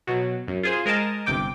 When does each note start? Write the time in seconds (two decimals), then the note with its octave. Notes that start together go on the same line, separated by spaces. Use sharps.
0.07 B2 F#3
0.48 F#2
0.63 F4 G#4 C5
0.86 G#3 A#4 D#5 A5
1.26 G1 C3 G5 D6